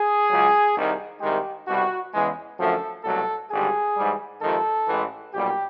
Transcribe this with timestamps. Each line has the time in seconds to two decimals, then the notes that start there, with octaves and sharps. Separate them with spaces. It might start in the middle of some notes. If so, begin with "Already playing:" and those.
Already playing: G#4
0.29 C#2 C#3 F#3
0.75 C2 C3 D#3
1.21 C2 C3 D#3 G#3 G4
1.67 C2 B2 G3 F#4
2.13 E2 C#3 E3 G#3
2.58 F#2 D3 F3 A3 A4
3.04 C2 B2 F#3 A3 A4
3.50 G#1 G2 D3 G3 G#4
3.95 G#2 E3 G3
4.42 F2 C3 D#3 G#3 A4
4.87 A1 A2 E3 G#3
5.33 B1 A#2 G3 G4